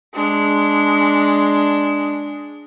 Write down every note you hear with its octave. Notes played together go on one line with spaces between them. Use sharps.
G#3 D4